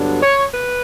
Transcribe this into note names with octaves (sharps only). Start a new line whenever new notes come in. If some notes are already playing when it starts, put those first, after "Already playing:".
Already playing: G2 D3 F#3 B3 D4
C#5
B4